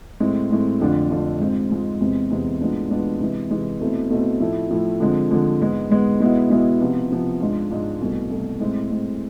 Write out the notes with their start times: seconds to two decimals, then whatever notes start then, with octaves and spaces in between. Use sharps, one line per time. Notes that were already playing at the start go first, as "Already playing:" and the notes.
0.20 A2 G#3 C4
0.51 A2 G#3 C4
0.80 F2 D3 A3 D4 F4
1.11 F2 D3 A3 D4 F4
1.40 G#2 G#3 C4 F4
1.70 G#2 G#3 C4 F4
2.00 E2 C3 G#3 C4
2.30 E2 C3 G#3 C4
2.60 A2 G#3 B3 D4 F4
2.90 A2 G#3 B3 D4 F4
3.20 C3 E3 G#3
3.51 C3 E3 G#3
3.80 B2 A3 C4 E4
4.10 B2 A3 C4 E4
4.40 A2 F3 A3 E4
4.71 A2 F3 A3 E4
5.00 D3 F3 G#3 C4
5.31 D3 F3 G#3 C4
5.61 G#2 G#3 B3
5.90 G#2 G#3 B3
6.20 B2 G#3 B3 E4
6.50 B2 G#3 B3 E4
6.80 C3 F3 B3 F4
7.10 C3 F3 B3 F4
7.40 G#2 G#3 D4 F4
7.71 G#2 G#3 D4 F4
8.00 C2 B2 A3
8.30 C2 B2 A3
8.60 A2 G#3 C4
8.90 A2 G#3 C4